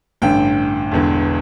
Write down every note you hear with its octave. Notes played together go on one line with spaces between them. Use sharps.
A1 G2 D3 G5
E1 E2 D3